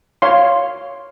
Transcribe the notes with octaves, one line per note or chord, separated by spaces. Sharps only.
C#5 F5 C6